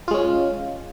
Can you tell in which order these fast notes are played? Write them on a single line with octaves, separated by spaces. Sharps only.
F4 G#3 C#4